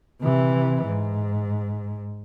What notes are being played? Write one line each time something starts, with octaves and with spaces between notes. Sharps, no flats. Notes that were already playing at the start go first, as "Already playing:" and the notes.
C3 E3
G#2